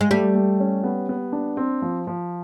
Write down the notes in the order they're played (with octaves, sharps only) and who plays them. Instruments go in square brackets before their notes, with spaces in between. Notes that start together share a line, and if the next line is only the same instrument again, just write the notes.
[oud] G#3
[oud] G3 [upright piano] A3
[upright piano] A3
C#4
B3
B3
D4
C4
F3
F3